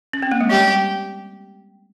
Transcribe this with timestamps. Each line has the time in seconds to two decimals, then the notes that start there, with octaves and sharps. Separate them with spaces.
0.13 C#4
0.23 C4
0.31 A#3
0.41 G#3
0.49 G3 G4